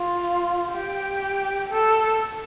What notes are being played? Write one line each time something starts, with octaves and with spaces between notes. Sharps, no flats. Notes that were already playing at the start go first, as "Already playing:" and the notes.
Already playing: F4
G4
A4